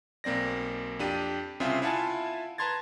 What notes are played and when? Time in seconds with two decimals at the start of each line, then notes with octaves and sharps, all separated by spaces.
0.24 B1 A#3 C4 D5 A#6
0.99 F2 D4 G4 D#7
1.60 C2 C#3 C4 C#4 F4 E5
1.82 E4 F4 E5 F#5 G#5 A5
2.58 B4 A5 A#5 C6 G#6 A6